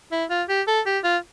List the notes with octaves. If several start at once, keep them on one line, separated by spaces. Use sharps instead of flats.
E4
F4
G4
A4
G4
F4